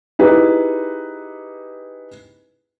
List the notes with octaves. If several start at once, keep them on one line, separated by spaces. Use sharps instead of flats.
D#4 E4 G4 G#4 B4